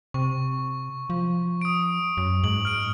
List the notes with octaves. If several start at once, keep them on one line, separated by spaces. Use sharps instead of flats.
C3 C#6
F3
D#6 D7
F#2
G#2 F#7
F6 D7